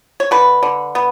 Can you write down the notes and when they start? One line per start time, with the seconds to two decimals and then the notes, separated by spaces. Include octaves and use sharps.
0.20 C#5
0.31 D3 B4
0.63 D3
0.95 B3